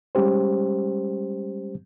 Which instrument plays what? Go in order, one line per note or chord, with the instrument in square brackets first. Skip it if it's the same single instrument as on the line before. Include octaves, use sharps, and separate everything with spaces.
[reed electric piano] G3 G#3 C#4 G4 C5